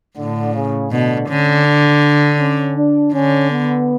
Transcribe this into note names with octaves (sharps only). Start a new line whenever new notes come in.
A2 D3
C#3
B2 D3
D3 C#4
D4
C#4
D4
D3 C#4
B3